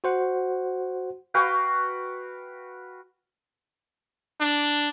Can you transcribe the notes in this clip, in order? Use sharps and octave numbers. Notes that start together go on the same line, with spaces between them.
F#4 C5 F#5
F#4 B4 F5 G5
D4